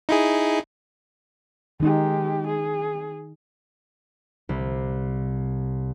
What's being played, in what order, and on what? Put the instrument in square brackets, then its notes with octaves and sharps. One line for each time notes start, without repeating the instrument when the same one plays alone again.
[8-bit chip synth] D#4 E4 G#4
[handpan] D#3 D#4 [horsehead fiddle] G#3 G4
[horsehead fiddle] G#4
[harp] C2